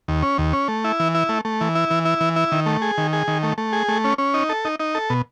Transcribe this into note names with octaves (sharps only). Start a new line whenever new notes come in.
D#2
C#4
D#2
C#4
A3
E4
E3
E4
A3
A3
E3
E4
E3
E4
E3
E4
D#3
A3
G#4
D#3
G#4
D#3
A3
A3
G#4
A3
C#4
C#4
D#4
A4
D#4
D#4
A4
B2